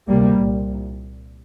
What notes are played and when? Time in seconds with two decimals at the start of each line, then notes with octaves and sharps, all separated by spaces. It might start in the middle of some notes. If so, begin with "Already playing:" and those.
0.08 D2 C3 G3 A#3
0.40 C2 A#2